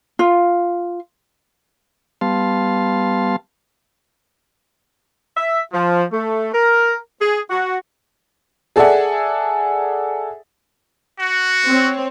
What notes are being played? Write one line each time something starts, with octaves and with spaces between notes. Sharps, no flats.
F4
G3 B3 F5 A5 C6
E5
F3
A3
A#4
G#4
F#4
G#4 A4 D5 E5 F#5 G#5
F#4
C4 C#5